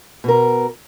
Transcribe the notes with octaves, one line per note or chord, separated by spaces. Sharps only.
B2 A#4